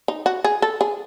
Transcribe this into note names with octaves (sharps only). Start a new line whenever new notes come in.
D#4
F#4
G#4
A4
G#4